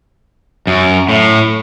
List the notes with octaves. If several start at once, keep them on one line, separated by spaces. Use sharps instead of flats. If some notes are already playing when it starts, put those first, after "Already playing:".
F#2
A2